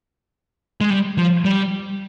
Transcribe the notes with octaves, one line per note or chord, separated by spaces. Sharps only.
G#3
G3
F3
G3